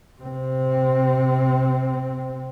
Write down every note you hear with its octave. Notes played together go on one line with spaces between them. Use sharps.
C3 C4